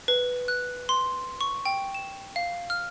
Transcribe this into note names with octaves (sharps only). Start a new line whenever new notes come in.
B4
F#6
C6
C#6
G5
E7
F5
F6